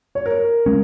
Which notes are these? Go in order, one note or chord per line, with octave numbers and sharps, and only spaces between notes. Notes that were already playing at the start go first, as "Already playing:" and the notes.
C#5
A#4
G#3 C#4